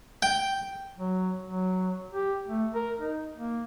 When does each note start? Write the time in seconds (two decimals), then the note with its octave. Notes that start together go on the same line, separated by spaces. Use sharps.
0.22 G5
0.98 F#3
1.45 F#3
2.12 G4
2.48 A3
2.74 A#4
2.99 D#4
3.36 A#3